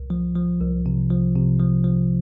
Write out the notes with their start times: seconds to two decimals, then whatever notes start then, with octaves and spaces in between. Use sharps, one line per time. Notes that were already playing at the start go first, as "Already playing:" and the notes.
Already playing: C2
0.10 F3
0.36 F3
0.61 C2
0.86 C3
1.10 F3
1.35 C3
1.59 F3
1.84 F3